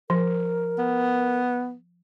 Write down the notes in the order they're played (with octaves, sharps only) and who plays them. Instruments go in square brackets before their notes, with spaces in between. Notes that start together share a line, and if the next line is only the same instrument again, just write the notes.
[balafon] F3 [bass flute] A#4
[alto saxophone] B3